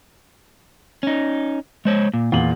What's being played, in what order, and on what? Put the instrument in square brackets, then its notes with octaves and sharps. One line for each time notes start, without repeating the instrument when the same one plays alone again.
[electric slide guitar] C#4 D#4
G#3 C5 C#5
A#2
[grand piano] E2 A#2 F#7 [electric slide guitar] F4